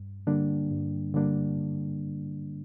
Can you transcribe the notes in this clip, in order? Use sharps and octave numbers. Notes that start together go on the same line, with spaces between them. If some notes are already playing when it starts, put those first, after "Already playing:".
Already playing: G2
D3 G3 A#3 D4
G2
D3 G3 A#3 D4